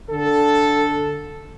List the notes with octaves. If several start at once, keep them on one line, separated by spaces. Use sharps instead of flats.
D3 A4